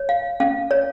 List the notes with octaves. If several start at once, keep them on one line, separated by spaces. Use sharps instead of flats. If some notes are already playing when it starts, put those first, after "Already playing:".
Already playing: C#5
F5
C#4 F5
C#5